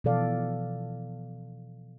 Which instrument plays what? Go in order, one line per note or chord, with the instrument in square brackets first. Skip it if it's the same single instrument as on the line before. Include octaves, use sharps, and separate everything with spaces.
[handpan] B2 E3 F3 A4 D5 F5